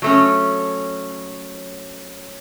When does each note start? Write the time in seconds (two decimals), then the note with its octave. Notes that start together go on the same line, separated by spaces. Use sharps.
0.02 F#3 A3 C#4